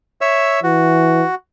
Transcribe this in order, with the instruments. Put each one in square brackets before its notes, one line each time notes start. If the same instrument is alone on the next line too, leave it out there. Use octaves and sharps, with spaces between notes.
[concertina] C#5 E5 E6
[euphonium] E3 [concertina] F#4